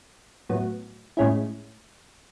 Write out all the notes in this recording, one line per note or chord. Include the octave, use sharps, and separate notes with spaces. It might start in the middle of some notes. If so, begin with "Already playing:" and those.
A2 F#3 B3
A2 G#3 C#4 E4